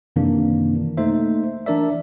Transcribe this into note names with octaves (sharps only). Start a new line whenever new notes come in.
F#2 C3 D#3 E3 A#3 D4
A3 A#3 D#4 C5 E5
E3 D4 A#4 D5 E5